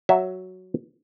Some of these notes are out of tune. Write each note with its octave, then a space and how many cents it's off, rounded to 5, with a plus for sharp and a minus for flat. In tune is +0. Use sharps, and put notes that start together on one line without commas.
F#3 +0 E5 +0